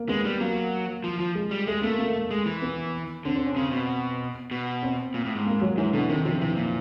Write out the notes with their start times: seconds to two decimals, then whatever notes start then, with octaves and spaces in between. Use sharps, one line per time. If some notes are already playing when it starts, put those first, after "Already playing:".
Already playing: A#3
0.09 G#3 B3
0.25 G3
0.40 F#3 A#3
1.04 F3
1.20 F3
1.35 G#3
1.51 G3
1.67 G#3 A3
1.83 A3 A#3
1.99 A#3
2.31 G#3
2.46 E3
2.62 B3
3.25 D3 C4
3.36 C4
3.46 C#4
3.56 C#3 C4
3.72 B2
4.51 B2
4.83 C4
5.14 A#2
5.25 A2
5.35 G#2
5.46 A#3
5.61 F#3
5.78 G#2 E3
5.93 B2 D3
6.09 C3 D#3
6.25 C3 F3
6.41 C3 E3
6.56 A#2